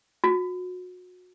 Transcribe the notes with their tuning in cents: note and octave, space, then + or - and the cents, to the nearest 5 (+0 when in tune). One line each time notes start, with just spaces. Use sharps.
F#4 -30